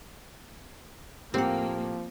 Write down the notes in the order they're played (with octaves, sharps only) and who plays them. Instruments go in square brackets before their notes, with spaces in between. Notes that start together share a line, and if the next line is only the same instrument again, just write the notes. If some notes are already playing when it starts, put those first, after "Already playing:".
[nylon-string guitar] A2 E4 G4 [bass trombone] F3 [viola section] A#3 [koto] C4 F#5